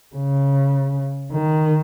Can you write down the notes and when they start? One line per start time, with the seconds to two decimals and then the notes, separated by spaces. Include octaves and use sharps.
0.15 C#3
1.33 D#3